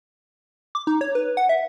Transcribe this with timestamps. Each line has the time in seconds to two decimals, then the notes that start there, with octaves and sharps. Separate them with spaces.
0.75 D6
0.87 D#4
1.01 C#5
1.15 B4
1.37 F#5
1.49 E5